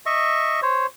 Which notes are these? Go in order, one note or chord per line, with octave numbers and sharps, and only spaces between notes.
D#5 E5 C#6
C5 C#5